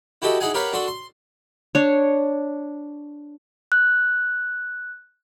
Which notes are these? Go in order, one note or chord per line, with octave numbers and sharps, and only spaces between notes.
E4 F#4 G4 A4 D#5
D#4 E4 G#4 F#5 G#5
G4 A#4 B4 C#5 F5 F#5
D4 F#4 A4 C6
C6
D4 C#5
F#6